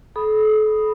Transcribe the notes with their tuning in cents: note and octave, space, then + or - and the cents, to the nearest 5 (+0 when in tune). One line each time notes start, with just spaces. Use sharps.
A4 -35 B5 +0 D#6 +0